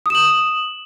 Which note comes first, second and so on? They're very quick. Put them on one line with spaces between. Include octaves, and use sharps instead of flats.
D#6 E7 F#7